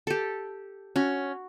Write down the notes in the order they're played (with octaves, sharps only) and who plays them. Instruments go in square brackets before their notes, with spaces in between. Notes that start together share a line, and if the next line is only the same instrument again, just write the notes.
[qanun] G4 A4
[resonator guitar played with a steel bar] C#4 [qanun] F#4